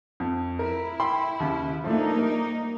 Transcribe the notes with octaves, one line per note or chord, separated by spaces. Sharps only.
F2
E4 A#4
G5 B5 C6
D#2 C#3
F3 G3 A3 A#3 D4 D#4
A#4